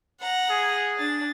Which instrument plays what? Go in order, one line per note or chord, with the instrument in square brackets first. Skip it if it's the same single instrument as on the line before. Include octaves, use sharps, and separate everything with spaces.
[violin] F#5 A#5
[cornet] G#4
[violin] D4 A6